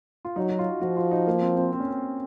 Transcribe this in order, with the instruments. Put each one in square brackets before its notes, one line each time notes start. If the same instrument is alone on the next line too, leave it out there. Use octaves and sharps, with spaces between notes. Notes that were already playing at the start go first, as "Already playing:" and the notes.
[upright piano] F4
[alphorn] F#3 [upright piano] D#4
[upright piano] F#4
F4
[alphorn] F3 [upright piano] F#4
[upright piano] F4
D#4
A#3
C4
C4
C4
C#4
C4